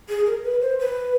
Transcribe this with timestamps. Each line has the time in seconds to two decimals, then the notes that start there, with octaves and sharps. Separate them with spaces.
0.09 G#4
0.27 A#4
0.44 B4
0.62 C5
0.79 B4